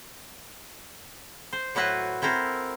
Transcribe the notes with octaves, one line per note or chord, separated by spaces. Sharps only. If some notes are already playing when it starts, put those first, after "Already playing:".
C5
A2 F#3 E4 F#4 B4 C5
C4 E4 A4 A#4 C5